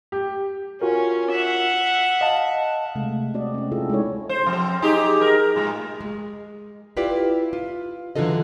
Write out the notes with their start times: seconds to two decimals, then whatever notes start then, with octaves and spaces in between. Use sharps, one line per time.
0.12 G4
0.82 C#4 F4 F#4 A#4
1.31 E5 F#5
2.21 D#5 F5 A5
2.95 C3 G#3 A3
3.34 C4 F#4 D5 D#5
3.54 C4 C#4
3.72 C#4 E4 F4 G#4 A4
3.90 G#3 D#4 A4 C#5
4.29 C5
4.47 F2 C4
4.82 D#4 G4 G#4
5.21 A#4
5.56 A2 G#3
6.01 G#3
6.97 E4 F4 G4 B4 D5
7.53 F4
8.16 D3 E3 F#3 F4 A4 D#5